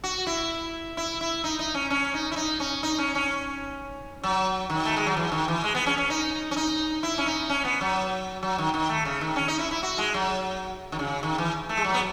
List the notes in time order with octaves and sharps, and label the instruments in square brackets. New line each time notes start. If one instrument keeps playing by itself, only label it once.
[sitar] F#4
E4
E4
E4
D#4
D#4
C#4
C#4
D#4
E4
D#4
C#4
D#4
C#4
C#4
F#3
D#3
A3
G#3
F#3
E3
D#3
E3
G#3
B3
C#4
C#4
D#4
C#4
D#4
E4
C#4
D#4
C#4
B3
F#3
F#3
D#3
D#3
A3
C#3
D#3
C#4
D#4
E4
E4
F#4
G#3
F#3
D#3
C#3
D#3
E3
A3
G#3
F#3
B3